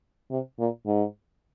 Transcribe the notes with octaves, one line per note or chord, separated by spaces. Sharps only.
C3
A#2
G#2